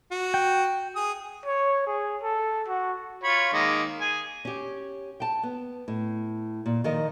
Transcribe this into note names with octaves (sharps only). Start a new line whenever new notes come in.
F#4
G5
G#4 D#6
C#5
G#4
A4
F#4
F4 C#5 B5
D#3 G#3 A#3
G#4 G#5
C#4 G4
G5 A5
B3
A2
A#2
D#3 F3 A#4 D#5